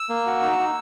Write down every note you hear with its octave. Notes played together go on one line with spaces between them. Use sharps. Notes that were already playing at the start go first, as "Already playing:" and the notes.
Already playing: E6
A#3
F#4
D#4
D#4